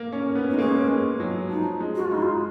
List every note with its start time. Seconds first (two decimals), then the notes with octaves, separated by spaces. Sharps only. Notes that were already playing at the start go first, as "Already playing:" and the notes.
Already playing: A#3
0.12 C#4
0.35 B3
0.50 D#4
0.54 G#3
0.58 A#3 C#4
0.89 G#3
1.20 F#3
1.49 F3 D#4
1.81 G#3
1.95 F#4
2.05 F4
2.11 G#3 D#4
2.22 F4